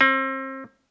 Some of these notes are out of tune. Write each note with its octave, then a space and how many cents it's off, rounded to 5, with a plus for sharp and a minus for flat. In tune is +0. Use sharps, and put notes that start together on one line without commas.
C4 +35